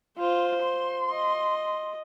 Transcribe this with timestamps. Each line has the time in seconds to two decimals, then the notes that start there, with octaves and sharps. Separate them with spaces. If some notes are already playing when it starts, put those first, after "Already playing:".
0.18 F4 C5
0.63 C6
1.11 D#5